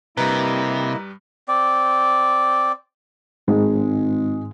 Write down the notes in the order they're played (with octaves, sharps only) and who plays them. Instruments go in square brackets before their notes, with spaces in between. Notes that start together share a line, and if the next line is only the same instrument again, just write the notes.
[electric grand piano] G2 G3 B4 [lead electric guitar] C3 [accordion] A#3 E4 D#5 [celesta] A#5
[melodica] C4 D5
[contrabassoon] G#1 [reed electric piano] G#2 [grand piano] G#3